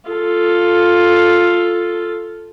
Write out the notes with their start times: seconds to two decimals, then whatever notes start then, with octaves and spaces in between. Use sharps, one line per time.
0.10 F4 A4